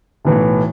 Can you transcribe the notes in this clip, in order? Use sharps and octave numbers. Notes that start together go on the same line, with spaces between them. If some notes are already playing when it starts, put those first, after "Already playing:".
B1 A2 E3